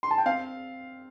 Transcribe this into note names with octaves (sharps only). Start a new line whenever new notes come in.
C6
A5
G5
C4 F5